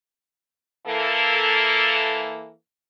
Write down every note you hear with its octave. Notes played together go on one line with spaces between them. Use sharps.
E3 A#3 A4